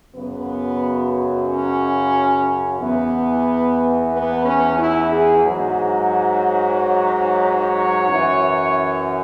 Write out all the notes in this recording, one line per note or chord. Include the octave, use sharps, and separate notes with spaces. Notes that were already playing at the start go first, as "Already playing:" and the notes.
F#2 C#3 F#3 B3
C#4
E2 E3 B3
B3
C#4
E4
G#4
G#2 F#3
C#5
C#5
F#2 E3